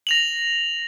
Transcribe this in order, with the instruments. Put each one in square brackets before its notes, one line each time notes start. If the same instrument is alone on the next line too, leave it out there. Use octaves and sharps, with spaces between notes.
[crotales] A#6 F7 F#7